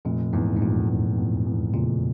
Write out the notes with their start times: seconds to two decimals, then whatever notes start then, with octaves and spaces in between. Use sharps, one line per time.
0.05 F1 A#2
0.33 E2 G#2
0.57 G#2
0.61 F1 A#2
0.89 E2
1.17 E2
1.46 E2
1.74 F1 A#2 C#3